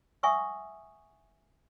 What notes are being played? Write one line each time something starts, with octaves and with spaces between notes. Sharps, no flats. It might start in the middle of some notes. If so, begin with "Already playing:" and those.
E5 F#5 G#5 C#6 D#6 E6